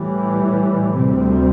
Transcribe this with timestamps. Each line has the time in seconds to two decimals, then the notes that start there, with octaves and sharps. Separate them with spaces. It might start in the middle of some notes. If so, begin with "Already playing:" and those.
Already playing: A2 E3 G3
0.97 D2 C3 G3 C4